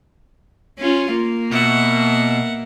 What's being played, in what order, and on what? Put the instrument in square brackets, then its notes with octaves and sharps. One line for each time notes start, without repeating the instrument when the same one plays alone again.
[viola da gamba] C#4 F4
A#3
[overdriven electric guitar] B2 [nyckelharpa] E5 F#5